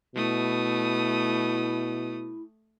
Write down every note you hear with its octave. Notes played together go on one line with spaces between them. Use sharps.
B2 A3 E4 D#6